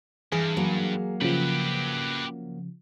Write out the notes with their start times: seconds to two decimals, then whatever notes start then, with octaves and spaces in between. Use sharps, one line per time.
0.32 G2 E3 G#4
0.57 F#3 A#3
1.22 C#3 F3 G4 B4